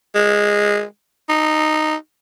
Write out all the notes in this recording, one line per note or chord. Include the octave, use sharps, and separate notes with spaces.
G#3
D#4